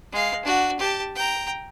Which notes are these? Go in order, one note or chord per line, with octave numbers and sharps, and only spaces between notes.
G#3 F5
D4 F#4
G4 A5
G5 A#5